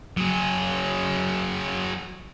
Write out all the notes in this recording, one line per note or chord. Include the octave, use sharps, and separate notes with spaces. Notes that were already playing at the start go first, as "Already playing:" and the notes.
F#3 G#4